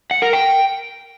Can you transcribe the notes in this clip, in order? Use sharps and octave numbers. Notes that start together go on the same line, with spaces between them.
F#5
A#4
G5